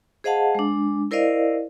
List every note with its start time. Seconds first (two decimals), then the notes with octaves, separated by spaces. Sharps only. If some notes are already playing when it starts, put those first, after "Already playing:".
0.24 G#4 C5 D#5 F5 F#5 A5
0.55 G#3 D4
1.11 E4 A#4 C5 D5 D#5 F5